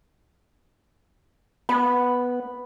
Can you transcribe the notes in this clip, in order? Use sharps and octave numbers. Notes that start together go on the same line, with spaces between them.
B3 B5